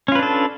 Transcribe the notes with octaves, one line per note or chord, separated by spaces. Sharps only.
C#4 D4 F4 A4 B4